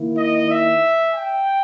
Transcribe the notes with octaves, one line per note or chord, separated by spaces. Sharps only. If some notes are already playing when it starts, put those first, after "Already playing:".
Already playing: D#3 A#3 E4
D#5
E5
G5